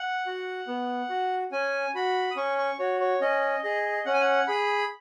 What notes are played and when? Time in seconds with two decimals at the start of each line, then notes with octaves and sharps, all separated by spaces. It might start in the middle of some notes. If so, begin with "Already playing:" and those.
Already playing: F#5
0.26 F#4
0.68 B3
1.10 F#4
1.52 C#4 G#5
1.95 F#4 B5
2.31 D#6
2.36 C#4 C#6
2.58 C#6
2.79 F#4 C#5
3.00 C#5
3.21 C#4 D#5
3.63 G#4 D#5
4.06 C#4 F#5
4.13 G#5
4.20 F#5
4.48 G#4 B5